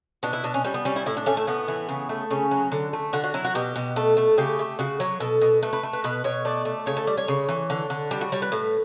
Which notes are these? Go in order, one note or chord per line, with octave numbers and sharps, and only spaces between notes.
B2 D4
E4
B2 D4
C#4
G3 C#4
B3
G3 C#4
E4
A2 E4
D4
A3 C#4
A3
A2 B3
E3
C#3
A3
C#3 C#4
F#3
D3
A3
D3 F#4
F#4
F#3 E4
F#4
B2 G4
B2
A3 A4
A3
C#3 G4
A3
C#3 F#4
F#3 C#5
B2 A4
B2
A3 B4
B4
A3
B4
B2 B4
B2 C#5
A3 D5
A3
C#3 C#5
A4
G3 D5
C#5
C#3
E3
D3
D3
G3 G4
F#4
G3 C#5
B4
A2